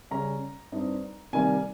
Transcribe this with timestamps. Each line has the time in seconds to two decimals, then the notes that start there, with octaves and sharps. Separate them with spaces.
0.11 C#3 G3 C#4 A#5
0.72 G2 G3 C4 D#4
1.33 C3 D#3 G3 A#3 G#5